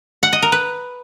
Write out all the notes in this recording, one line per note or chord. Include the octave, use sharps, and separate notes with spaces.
F#5
D#5
A#4
B4